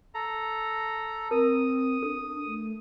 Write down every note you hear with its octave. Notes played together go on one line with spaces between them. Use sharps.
A4 A#5
C4 A#4 D#6
D4 A4
A3